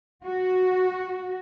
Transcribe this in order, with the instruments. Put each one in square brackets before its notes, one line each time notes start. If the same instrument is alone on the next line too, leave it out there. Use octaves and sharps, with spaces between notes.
[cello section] F#4